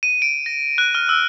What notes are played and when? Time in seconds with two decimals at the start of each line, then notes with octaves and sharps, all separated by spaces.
0.03 D#7
0.22 D7
0.46 A#6
0.78 F#6
0.95 F6
1.09 E6